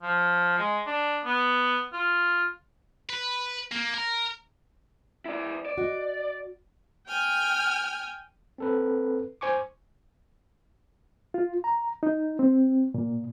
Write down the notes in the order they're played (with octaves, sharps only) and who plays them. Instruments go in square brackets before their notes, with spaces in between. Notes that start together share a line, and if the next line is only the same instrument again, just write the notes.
[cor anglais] F3
G#3
D4
B3
F4
[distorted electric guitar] B4
A#3
A#4
[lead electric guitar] E4 D5
D5
[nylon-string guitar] F#4 D#5
[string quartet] G5 G#5 F6
[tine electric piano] C4 A4 B4
C5 G#5 C#6 D6
[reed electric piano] F4
A#5
D#4
C4
A#2